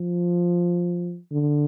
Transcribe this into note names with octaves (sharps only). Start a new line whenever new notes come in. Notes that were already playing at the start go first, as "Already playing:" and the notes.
Already playing: F3
D3